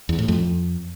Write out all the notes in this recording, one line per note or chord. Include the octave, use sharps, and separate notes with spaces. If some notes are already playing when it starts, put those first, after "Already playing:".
E2
A2
F2